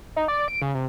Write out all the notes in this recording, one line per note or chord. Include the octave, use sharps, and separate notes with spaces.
D#4
D5
D7
C#3
C3